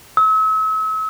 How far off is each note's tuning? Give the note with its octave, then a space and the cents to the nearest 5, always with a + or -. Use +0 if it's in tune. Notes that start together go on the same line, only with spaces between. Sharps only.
E6 -40